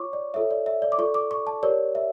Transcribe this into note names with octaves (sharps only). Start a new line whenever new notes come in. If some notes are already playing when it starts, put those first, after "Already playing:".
Already playing: F4 C#5 C#6 D6
D5
F4 A4 C#5 E5
D5
E5
D5
D6
F4 A4 D5 C#6
D6
C#6
A5
G4 A#4 C#5 D5
E5